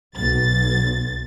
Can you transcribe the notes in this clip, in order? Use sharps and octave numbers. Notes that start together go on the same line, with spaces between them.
B1 A6